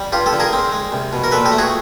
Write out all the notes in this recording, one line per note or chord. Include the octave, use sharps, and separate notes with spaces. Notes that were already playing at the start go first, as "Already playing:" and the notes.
Already playing: G3
G2 F4 G4
G4 A4
D3
G#4 A#4
C4
G#3
C2
B2
A#4
A#2 A4 B4
G4 A4
A3
F#4 G#4